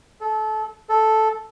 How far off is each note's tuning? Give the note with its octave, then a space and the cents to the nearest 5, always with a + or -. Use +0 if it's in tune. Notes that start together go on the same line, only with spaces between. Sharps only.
A4 -25
A4 -5